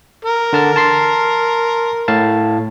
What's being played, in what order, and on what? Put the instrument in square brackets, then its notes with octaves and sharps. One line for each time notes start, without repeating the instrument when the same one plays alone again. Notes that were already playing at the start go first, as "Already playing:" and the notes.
[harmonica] A#4
[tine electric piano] D3 A5 F6
A5 C6 C7
A2 F5 A5